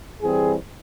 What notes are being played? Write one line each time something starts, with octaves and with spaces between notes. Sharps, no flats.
E3 G3 C4 G#4